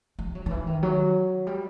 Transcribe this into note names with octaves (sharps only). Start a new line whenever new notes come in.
G3
F#3
D#3
E3
D#3
F#3
G3